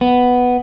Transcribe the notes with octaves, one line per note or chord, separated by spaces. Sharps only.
B3